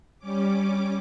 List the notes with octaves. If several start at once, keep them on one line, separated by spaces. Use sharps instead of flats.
G3 C#4 D6